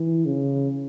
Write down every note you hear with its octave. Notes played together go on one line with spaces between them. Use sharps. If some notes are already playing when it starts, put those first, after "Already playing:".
Already playing: E3
C#3